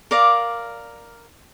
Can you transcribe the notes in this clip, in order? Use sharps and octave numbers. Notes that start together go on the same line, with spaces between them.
A#4 D5 F5